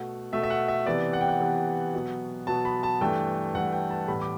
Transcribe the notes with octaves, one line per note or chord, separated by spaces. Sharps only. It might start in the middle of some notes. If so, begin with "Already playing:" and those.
Already playing: B2 A3 F#5
B2 A3 E5
E5
F#5
E5
C3 E3 B3 D5
F#5
G5
F#5
C3 E3 B3
B2 F#3 B3
B2 F#3 B3 A5
B5
A5
G2 E3 A3 G5
G2 E3 A3 F#5
G5
A5
A2 E3 G3 B3 B5
D6